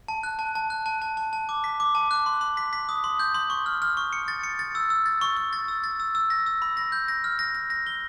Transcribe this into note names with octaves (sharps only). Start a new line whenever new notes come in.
A5
F#6
A5
A5
F#6
A5
A5
A5
A5
D6
B6
D6
A5
F#6
C6
C6
B6
B6
D#6
C6
G6
C6
C#6
F6
F6
C#6
C#7
A6
C#7
A6
E6
E6
A6
C#6
C#6
A6
E6
A6
E6
E6
A#6
E6
B5
A#6
G6
A#6
F6
A#6
A#6
A#6
G7